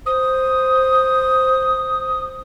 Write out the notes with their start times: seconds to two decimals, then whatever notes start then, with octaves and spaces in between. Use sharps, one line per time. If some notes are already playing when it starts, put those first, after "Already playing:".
0.06 C5 D#6